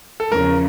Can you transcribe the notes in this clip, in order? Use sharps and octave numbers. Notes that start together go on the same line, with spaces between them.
A4
E2 C#3 F3 A#4